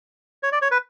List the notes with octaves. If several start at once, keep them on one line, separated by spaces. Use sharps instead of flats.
C#5
D5
C#5
B4